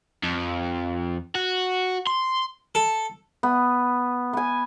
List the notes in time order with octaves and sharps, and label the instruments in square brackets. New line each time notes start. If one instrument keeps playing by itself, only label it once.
[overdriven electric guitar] F2
F#4
C6
[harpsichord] A4
[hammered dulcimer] B3
B3 G#5